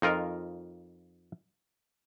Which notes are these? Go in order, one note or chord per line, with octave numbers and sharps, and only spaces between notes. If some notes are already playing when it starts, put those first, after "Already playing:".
F2 D#4 F4 A#4